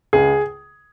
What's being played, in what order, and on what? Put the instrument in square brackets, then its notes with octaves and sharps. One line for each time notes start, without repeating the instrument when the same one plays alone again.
[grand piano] C#2 G#4